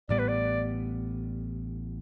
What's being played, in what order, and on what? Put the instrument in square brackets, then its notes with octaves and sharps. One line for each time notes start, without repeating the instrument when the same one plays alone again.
[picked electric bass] A1 A2 G3 B3 [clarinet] D5
[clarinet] B4
D5